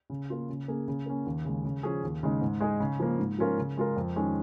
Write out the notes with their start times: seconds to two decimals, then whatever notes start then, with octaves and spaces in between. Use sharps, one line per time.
0.10 C#3
0.30 A#3 F4
0.49 C#3
0.68 A#3 C#4 G#4
0.88 C#3
1.06 A#3 C#4
1.26 D#2
1.45 C#3 G#3
1.65 C#3
1.83 F3 C#4 G#4
2.03 D#2
2.23 C#3 G#3 D#4
2.41 G#2
2.61 G#3 D#4 G#4
2.80 C#3
3.00 F3 A#3
3.19 G#2
3.38 F3 C#4 F4 A#4
3.58 C#3
3.77 G#3 F4 A#4
3.97 F2
4.16 D#3 G#3 C#4